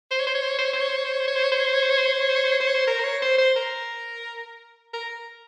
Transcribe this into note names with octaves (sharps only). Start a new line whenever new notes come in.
C5
C#5
C5
C#5
C5
C#5
C5
C#5
C5
C#5
C5
C#5
C5
C#5
C5
C#5
C5
C#5
C5
C#5
C5
C#5
C5
C#5
C5
C#5
C5
C#5
C5
C#5
C5
C#5
C5
C#5
C5
A#4
C5
C#5
C5
C5
A#4
A#4